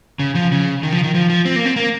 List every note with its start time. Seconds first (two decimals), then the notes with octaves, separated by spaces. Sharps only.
0.19 C#3
0.35 F3
0.52 C#3
0.83 D#3
0.92 F3
1.03 D#3
1.15 F3
1.30 F3
1.45 C4
1.56 A#3
1.65 C4
1.76 A#3